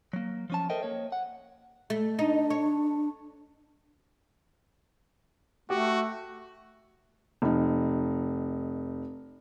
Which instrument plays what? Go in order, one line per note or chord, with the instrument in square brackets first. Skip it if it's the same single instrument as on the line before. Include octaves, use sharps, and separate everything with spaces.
[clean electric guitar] F#3 A#3
F3 C#4 A5
A4 A#4 C5 D#5 E5 G5
A#3 C#5
F#5
[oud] A3
[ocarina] D4 [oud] D#4
[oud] C#5
[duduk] A3 [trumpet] F#4 [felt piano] G4
[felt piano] F1 D#4